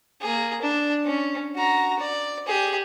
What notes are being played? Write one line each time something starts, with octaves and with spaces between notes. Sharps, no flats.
A#3 G#4
D4
C#4
F#4 A#5
D5
G4 G#4